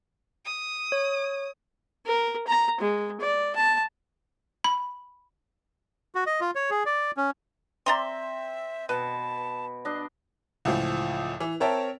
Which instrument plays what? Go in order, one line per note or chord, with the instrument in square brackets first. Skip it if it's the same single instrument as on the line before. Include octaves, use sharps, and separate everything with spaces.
[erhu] D#6
[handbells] C#5
[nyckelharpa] A#4
A#5
G#3
D5
A5
[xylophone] B5
[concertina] F#4
D#5
F4
C#5
G#4
D5
C#4
[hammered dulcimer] C4 [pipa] D5 A#5 C6 [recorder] E5
[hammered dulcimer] B2 [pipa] B4 [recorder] A5
[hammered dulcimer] D4 D#5
[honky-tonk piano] C#2 A2 E3 F3
E3
C4 A#4 C#5 E5 G5 A5